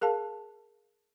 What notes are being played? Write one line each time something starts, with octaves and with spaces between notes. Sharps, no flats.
G#4 A#4 F5 A5